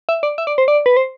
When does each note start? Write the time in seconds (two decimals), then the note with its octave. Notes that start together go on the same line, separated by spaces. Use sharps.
0.09 E5
0.23 D5
0.38 E5
0.47 D5
0.58 C5
0.68 D5
0.86 B4
0.97 C5